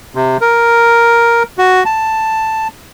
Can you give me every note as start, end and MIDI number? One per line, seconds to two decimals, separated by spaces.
0.15 0.37 48
0.41 1.43 70
1.58 1.84 66
1.85 2.68 81